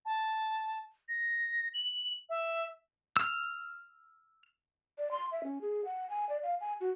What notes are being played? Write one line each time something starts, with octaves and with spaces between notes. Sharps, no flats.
A5
A#6
F#7
E5
E6 F6
D5
C6
E5
C#4
G#4
F#5
G#5
D5
F5
G#5
F#4